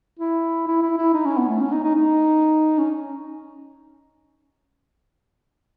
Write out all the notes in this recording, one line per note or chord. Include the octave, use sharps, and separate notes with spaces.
E4
E4
E4
E4
D#4
C#4
B3
A3
C#4
D#4
D#4
D#4
C#4